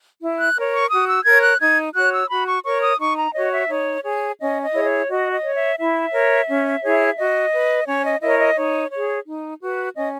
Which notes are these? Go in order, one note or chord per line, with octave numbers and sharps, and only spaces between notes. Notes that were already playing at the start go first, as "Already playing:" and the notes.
E4
F#6
A#4 C#5
C#6
F#4 D#6
E6
A#4 C#5 G#6
F#6
D#4 G#6
F#4 C#5 F#6
E6
F#4 B5
C#6
A#4 C#5 C#6
D#6
D#4 C#6
A#5
F#4 C#5 D#5
E5
D#4 C#5
G#4 C#5
C#4 D#5
D#5
E4 G#4 C#5
C#5
F#4 D#5
D#5
C#5
E5
E4 E5
A#4 C#5
C#4
E4 G#4 C#5
F#4 D#5
B4
C#4 C#5
D#5
E4 A#4 C#5 D#5
D#5
D#4 C#5
G#4 C#5
D#4
F#4 B4
C#4 D#5